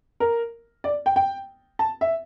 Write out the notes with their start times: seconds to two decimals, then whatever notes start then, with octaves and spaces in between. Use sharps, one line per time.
0.20 A#4
0.84 D5
1.06 G5
1.16 G5
1.79 A5
2.01 E5